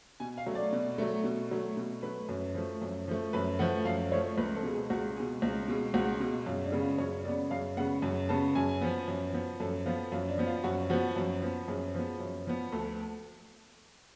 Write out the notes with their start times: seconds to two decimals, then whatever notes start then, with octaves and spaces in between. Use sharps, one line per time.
0.20 B2 G#5
0.38 F5
0.46 F#3 A3
0.55 D5
0.73 B2
0.98 F#3 A3
1.24 B2
1.51 F#3 A3
1.77 B2
2.03 F#3 A3 B4
2.29 F#2
2.55 F3 A3
2.82 F#2
3.08 F3 A3
3.33 F#2 B4
3.59 F3 A3 F#5
3.85 F#2 F5
4.11 F3 A3 C#5
4.38 C#2 B4
4.55 A4
4.63 B2 G#3
4.72 G#4
4.90 C#2 F#4
5.16 B2 G#3 G#4
5.42 C#2
5.68 B2 G#3
5.94 C#2 F#4
6.20 B2 G#3
6.46 F#2 F4
6.64 D4
6.72 C#3 G#3 B3
6.81 F4
6.98 F#2 C#5
7.25 C#3 G#3 B3 D5
7.51 F#2 F5
7.77 C#3 G#3 B3 F#5
8.02 F#2
8.29 C#3 G#3 B3 A5
8.55 F#2 G#5
8.81 F3 B3
9.08 F#2
9.33 F3 B3
9.60 F#2 A4
9.86 F3 B3 F4
10.12 F#2 F4
10.28 D4
10.38 F3 B3
10.47 F4
10.64 F#2 F#4
10.90 F3 B3 F#4
11.16 F#2
11.42 F3 B3
11.68 F#2 G#4
11.94 F3 B3
12.20 F#2
12.47 F3 B3
12.72 D2 A4